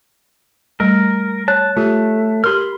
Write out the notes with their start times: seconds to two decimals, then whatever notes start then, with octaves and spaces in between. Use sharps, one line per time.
0.80 G3 A3 A#4
1.48 C#5 A5 F#6
1.77 A3 F4 G4
2.44 G4 A#4 B5 C6 F6